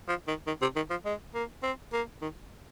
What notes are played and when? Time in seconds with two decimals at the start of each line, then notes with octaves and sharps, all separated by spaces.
0.08 F3
0.28 D#3
0.47 D#3
0.61 C3
0.76 D#3
0.90 F3
1.05 G#3
1.35 A#3
1.63 C4
1.93 A#3
2.22 D#3